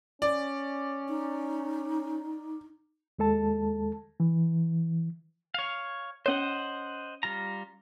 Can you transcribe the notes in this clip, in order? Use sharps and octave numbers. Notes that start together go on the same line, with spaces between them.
C#4 D5
D#4
D#2 G#3 A4 A5
E3
C#5 F5
C#4 C5 C#5 D#5 F#5
G3 F4 A#5